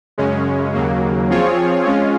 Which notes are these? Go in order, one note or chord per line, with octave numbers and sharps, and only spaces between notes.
F#2 C#3 G#3 C#4
D#2 C#3 F#3 A#3
F3 C4 F4 G#4 C#5
G#3 C#4 F4